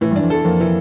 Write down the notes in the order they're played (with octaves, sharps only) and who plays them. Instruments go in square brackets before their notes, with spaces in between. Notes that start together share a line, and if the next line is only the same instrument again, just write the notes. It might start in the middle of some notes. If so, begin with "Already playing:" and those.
[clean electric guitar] A2 [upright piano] E3
[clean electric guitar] G2 [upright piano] D4
[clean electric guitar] F2
[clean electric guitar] E2 [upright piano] A4
[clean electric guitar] F2 [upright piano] A#3
[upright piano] E3